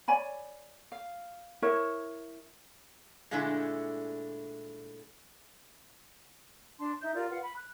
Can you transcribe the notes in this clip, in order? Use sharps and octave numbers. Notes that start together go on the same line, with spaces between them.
C#5 D5 G#5 B5
F5
E4 A#4 C#5 E5
A#2 D3 G#3 A3 D4 E4
D4 A5 C6
D#4 E5 G6
F4 G4 A#4 D5
F4 B4 F5 F#5
B5
F#6